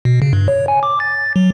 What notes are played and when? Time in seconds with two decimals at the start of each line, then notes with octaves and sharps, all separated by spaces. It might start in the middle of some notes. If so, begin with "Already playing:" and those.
0.05 B2
0.22 C#3
0.33 G2
0.48 C#5
0.68 G#5
0.83 D6
1.00 A6
1.36 F#3